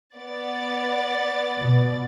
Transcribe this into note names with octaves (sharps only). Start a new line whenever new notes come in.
B3 D5 A6
B2